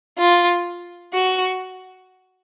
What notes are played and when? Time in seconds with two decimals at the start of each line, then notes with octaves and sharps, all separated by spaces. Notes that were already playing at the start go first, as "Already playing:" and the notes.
0.18 F4
1.13 F#4